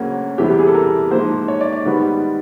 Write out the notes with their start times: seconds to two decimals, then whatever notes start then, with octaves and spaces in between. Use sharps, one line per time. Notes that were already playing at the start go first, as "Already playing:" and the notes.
Already playing: D2 C#3 F#3 A#3 C#4 F#4
0.38 E2 C3 E3 G3 G4
0.50 G4
0.59 G#4
0.67 A4
0.74 A#4
1.11 G#2 F3 A#3 C5
1.48 C#5
1.61 D5
1.73 D5
1.85 G#2 D#3 G3 B3